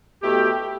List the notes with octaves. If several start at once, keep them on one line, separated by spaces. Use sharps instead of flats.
B2 A3 E4 G4